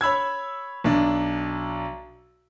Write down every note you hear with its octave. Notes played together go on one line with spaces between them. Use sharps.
C#5 B5 E6 G#6
B1 D4